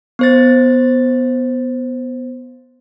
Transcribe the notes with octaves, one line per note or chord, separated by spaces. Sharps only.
B3 C5 A6